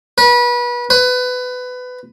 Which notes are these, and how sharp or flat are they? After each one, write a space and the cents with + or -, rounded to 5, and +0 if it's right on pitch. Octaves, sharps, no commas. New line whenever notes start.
B4 -30
B4 +20